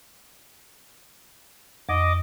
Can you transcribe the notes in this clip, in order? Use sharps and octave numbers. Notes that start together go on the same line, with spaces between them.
F2 D#5 D6